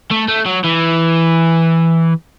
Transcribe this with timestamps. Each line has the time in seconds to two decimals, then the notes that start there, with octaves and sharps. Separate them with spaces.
0.11 A3
0.28 A3
0.45 F#3
0.64 E3